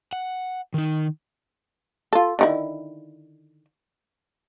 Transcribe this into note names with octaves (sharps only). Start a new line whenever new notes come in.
F#5
D#3 D#4
F4 A4
D3 D#3 E4